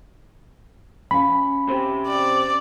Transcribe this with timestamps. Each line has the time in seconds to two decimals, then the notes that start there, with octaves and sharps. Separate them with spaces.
1.11 C#4 F5 B5
1.68 C3 C4 G4
2.08 D5